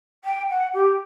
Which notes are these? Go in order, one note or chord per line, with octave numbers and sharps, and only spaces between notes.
G5
F#5
G4